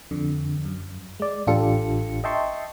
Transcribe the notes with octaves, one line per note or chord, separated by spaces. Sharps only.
F2 D3
F#2
G#3 D5
A1 D4 F4 G4 A4 C#7
D#5 E5 G5 A5 C6 C#6